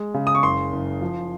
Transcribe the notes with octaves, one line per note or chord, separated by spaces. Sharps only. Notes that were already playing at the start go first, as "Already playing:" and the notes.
Already playing: G#3
C#3
D#6
C#6
F#1 C6
F#1
F3